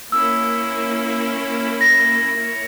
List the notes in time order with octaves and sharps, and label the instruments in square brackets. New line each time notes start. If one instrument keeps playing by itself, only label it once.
[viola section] A#3 C#4 E4 [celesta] E6
[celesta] A#6
[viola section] A#3 E4 A#4 C#5